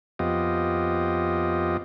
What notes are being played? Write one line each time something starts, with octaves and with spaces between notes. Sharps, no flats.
F2 B3 F4 G4 D#5